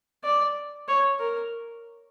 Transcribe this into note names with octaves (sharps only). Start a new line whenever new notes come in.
D5
C#5
A#4